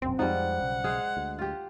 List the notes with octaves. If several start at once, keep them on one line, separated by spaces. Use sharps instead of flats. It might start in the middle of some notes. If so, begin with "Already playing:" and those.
E1 A#1 F#2 C4
F2 F3 G3 G#3 D#4 F#5
B1 C#3
G#3 G#4 F5
D2
F4 G4